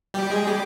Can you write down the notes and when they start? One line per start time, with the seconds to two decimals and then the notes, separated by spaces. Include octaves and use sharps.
0.14 G3 G4
0.30 G#3 G#4
0.47 G3 G4